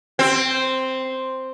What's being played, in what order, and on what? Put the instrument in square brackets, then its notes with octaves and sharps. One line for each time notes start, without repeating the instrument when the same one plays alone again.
[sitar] C4